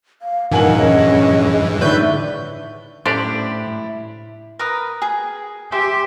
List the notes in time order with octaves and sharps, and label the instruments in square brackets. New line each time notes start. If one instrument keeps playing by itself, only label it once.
[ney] F5
[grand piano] D#1 G#5 F#7 [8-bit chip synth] G2 E3 [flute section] D#4 F#5 [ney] A#4
[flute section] C#4 D#5 [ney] G#4
[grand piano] A2 D3 [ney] D#4 [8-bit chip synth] B4 G6 [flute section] D5 E5 C#6
[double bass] A2 [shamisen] C#4 A4 C5 [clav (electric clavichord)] D4 G4 D5 [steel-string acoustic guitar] E4
[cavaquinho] A#4 B4 D#6
G#4
[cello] G4 [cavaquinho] G#4 C5 E5